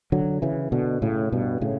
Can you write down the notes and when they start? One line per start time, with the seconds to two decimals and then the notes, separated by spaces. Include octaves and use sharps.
0.12 D3 F#3
0.42 C#3 E3
0.72 B2 D3
1.02 A2 C#3
1.32 G2 B2
1.61 A2 C#3